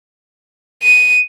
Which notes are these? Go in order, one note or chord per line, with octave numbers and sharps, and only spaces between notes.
D#7